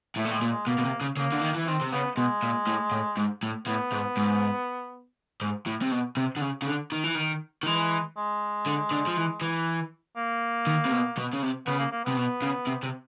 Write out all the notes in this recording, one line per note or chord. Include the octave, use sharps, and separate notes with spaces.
A2 A3
A#2
A2 G#3
A#2
G#3
B2 A#3
B2
C3
C#3
C#3 A#3
D3
D#3
E3
D#3 C4
C3
C#3 B3
B2 G#3
A#2
A2
A2
G#2
A2
A2 B3
G#2
G#2
G#2
A2
C3
B2
C3
D3
C#3
C#3
D3
D#3
E3
D#3
D#3
E3 G#3
G#3
D3
D3
F3
E3
E3
A#3
D#3
C3
B2
B2
C#3
C3
C#3 B3
A#3
A#3
C3 B3
B2
C#3
C3
C3